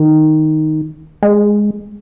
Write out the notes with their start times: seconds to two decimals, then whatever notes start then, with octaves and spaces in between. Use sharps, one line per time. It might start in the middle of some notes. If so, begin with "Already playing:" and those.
Already playing: D#3
1.23 G#3